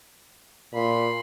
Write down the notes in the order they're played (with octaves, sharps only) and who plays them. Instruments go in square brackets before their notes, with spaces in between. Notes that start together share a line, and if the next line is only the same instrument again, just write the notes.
[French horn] A#2 [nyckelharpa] B5 C6